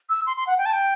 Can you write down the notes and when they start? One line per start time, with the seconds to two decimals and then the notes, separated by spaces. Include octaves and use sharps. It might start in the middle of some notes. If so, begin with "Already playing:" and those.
0.09 E6
0.27 C6
0.37 C6
0.47 F#5
0.58 G5
0.66 A5
0.73 G5